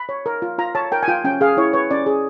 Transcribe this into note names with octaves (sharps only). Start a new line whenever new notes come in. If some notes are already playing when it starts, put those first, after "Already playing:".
Already playing: B5
C#5
A#4
F4
F4 A#5
C#5 A5
A#4 G5
G#5
F4 G5
C#4 G5
G#4 F5
E4 C#5
B4 C#5
C#4 D5
G#4